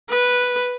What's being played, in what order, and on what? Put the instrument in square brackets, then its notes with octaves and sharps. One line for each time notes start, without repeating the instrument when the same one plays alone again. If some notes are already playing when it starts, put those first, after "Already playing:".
[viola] B4